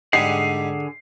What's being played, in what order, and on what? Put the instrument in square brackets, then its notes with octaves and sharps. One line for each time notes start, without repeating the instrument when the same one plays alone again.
[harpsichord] G#2 G3 [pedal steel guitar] D3 G#4 F#5 [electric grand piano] C7